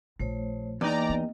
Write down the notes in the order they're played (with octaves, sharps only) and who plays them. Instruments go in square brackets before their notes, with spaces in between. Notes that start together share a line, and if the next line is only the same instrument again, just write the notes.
[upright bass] A#1 [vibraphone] A3 C5 C#5
[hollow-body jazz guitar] E2 D#4 [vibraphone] A#3 D#5 G5 [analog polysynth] D5 A#5
[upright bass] B3